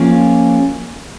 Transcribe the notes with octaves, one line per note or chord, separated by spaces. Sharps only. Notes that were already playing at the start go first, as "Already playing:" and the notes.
Already playing: F3 A#3 C#4 F4 G#4